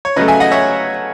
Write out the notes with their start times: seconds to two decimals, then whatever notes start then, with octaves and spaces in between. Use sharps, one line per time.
0.05 C#5
0.16 C#3 F#3 A3 B4 D#5
0.28 E5 G#5
0.40 D#5 F#5
0.52 C#5 E5